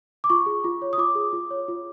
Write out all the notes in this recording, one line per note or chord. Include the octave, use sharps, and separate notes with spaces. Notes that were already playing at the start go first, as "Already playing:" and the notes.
D6
F4 C#6
G#4
F4
C#5
D#6
F4 D6
G#4
F4
C#5
F4